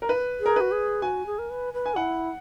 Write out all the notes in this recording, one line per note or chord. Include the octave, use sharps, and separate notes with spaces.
A#4
B4
G#4
A#4
F#4 B4
G#4
F#4 G#5
G#4
A#4
B4
B4
G#5
E4 F#5